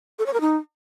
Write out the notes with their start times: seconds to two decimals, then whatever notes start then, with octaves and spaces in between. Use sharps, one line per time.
0.19 A4
0.26 C#5
0.33 A#4
0.41 D#4